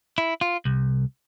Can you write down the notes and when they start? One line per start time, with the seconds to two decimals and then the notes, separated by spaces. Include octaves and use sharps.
0.18 E4
0.41 F4
0.65 C2